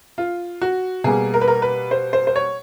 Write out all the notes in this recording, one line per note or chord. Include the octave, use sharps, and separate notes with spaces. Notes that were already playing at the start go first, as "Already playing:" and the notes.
F4
F#4
B2 G3 A#3 G#4
A#4
B4
A#4
B4
C5
C5
C5
C#5